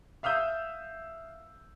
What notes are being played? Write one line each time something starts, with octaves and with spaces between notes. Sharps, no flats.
E5 F5 D#6 E6 G6